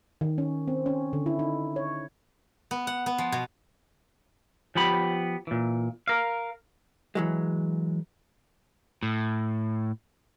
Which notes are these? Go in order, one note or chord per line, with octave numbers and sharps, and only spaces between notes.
D#3
C#4
C4
C#4
D3
E4
D#4
C#5
B3
F#5
B3
F3
B2
F3 B3 G4 B5
A#2 E3
A#4 F5
E3 F#3 G#3
A2